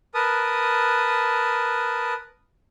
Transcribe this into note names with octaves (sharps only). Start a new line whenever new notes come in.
A#4 B4 A5 D#6